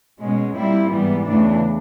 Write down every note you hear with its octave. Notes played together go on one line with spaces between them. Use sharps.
B2 G#3 C#4
A#2 G3 C4 E4
G#2 E3 G3 B3
E2 C#3 E3 A3 D4